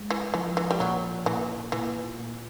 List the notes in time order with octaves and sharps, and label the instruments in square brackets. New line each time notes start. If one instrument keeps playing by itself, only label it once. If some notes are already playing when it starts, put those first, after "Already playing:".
Already playing: [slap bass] G#3
[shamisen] E3
[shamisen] E3 [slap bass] F3
[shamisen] E3
G3
[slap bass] A#2 [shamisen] F#3
[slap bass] A#2 [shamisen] E3
[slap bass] A#2 [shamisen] E3
[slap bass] A#2